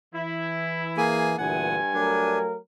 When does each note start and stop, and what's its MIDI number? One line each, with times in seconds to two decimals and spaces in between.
0.14 1.37 52
0.14 1.03 64
0.97 1.36 58
0.97 1.36 68
0.97 1.36 80
1.38 1.77 38
1.38 2.42 43
1.38 1.77 46
1.38 1.77 52
1.38 1.76 78
1.38 2.42 80
1.94 2.56 54
1.94 2.56 57
1.94 2.39 62
1.94 2.56 70